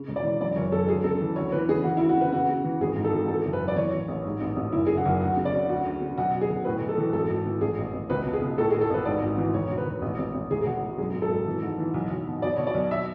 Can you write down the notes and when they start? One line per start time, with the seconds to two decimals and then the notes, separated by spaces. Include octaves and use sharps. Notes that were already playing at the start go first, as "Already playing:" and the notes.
Already playing: C#3
0.08 E1
0.16 D5
0.24 E3
0.41 F#2 D5
0.56 F#1 C#5
0.72 F#2 A4
0.88 D2 G#4
1.04 C#3 A4
1.21 E3
1.36 D2 C#5
1.52 E3 B4
1.69 C#3 G#4
1.84 E3 F#4
1.97 E4
2.00 D2
2.09 F#4
2.17 C#3 B4
2.32 C#3 F#4
2.49 C#3
2.64 E3
2.80 G#1 G#4
2.96 G#2
3.04 A4
3.12 G#1
3.28 E3 A4
3.45 F#1
3.53 B4
3.60 F#2
3.68 D5
3.76 E3 C#5
3.92 A1
4.08 A1
4.25 G#2
4.41 A1
4.56 A1
4.72 F#1 E4
4.87 C#3 G#4
4.97 F#4
5.05 F#1
5.20 D2 F#4
5.37 C#3
5.45 D5
5.53 C#3
5.69 D2 F#4
5.86 D2
6.01 C#3
6.18 B1 F#4
6.34 B1
6.41 G#4
6.50 B1
6.65 A2 B4
6.81 B1
6.89 A4
6.97 E3
7.13 G#1 A4
7.29 G#1
7.46 E3
7.61 A1 G#4
7.78 A1
7.93 A1
8.10 C#2 B4
8.26 B2
8.33 G#4
8.41 C#2
8.58 A2 A4
8.70 G#4
8.74 A2
8.81 A4
8.90 A1 B4
9.05 G#2 D5
9.22 G#1
9.38 E3
9.54 E1 C#5
9.69 D2
9.78 B4
9.86 E1
10.02 A1
10.19 A1
10.34 A1
10.50 E1 G#4
10.61 G#4
10.66 E1 F#4
10.82 E1
10.98 F#2 G#4
11.14 G#1
11.22 A4
11.31 G#1
11.47 E3
11.63 G#2
11.78 E3
11.94 B1
12.10 B1
12.27 B2
12.42 B2 D5
12.57 B2 C#5
12.67 D5
12.74 B1
12.91 E5